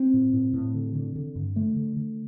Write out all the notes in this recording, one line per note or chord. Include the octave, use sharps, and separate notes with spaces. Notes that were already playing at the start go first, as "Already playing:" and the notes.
Already playing: C4
A2
A2
A2
D3
D3
D3
G2
D3 A3
D3
D3